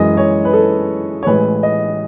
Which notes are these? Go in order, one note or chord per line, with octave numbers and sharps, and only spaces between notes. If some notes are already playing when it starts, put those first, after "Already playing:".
Already playing: F#2 E3 G#3 D#5
C#5
B4
A4
C#5
A1 A2 G#3 B4
D#5